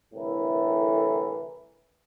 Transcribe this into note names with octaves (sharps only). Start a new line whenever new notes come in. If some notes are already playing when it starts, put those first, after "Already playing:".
C2 A2 D3 E3 E4 A#4